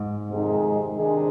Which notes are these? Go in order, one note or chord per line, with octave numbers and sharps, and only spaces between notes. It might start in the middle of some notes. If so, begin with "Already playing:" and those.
Already playing: G#2
F2 C3 D#3 G#3 D#4
C3 D#3 G#3 D4 G#4